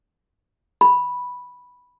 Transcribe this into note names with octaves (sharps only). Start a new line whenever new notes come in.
B5